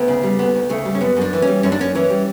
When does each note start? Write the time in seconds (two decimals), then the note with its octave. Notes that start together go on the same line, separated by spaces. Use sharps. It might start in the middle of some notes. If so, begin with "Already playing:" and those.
Already playing: D2 B3
0.08 C#3
0.23 G3
0.39 D2 B3
0.54 D2
0.69 C#3 A3
0.85 G3
0.95 C#4
1.01 F#2 B3
1.17 F#2 D4
1.33 E3
1.42 C#4
1.47 G3
1.63 F#2 C#4
1.72 D4
1.79 F#2 C#4
1.95 E3 C#4
2.10 G3